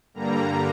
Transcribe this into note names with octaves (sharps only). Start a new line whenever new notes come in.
G2 D3 G3 A#3 A#5